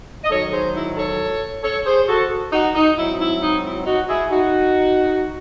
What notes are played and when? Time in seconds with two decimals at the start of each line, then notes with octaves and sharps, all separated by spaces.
0.24 D#5
0.30 G#2 D#3 F#3 A4 C#5
0.53 G#4 C5
0.75 E4
0.97 A4 C#5
1.64 A4 C#5
1.86 G#4 C5
2.09 F#4 A4
2.53 D#4 F#4
2.75 D#4
2.97 G#2 F#3 C4 D#4 E4
3.19 E4
3.42 D#4
3.64 E4
3.86 D#4 F#4
4.08 E4 G#4
4.31 D#4 F#4